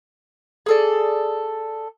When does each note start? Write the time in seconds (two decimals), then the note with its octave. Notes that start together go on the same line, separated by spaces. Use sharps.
0.66 G#4 A4 D5